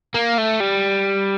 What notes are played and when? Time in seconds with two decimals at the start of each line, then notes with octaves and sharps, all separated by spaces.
0.15 A#3
0.38 A3
0.60 G3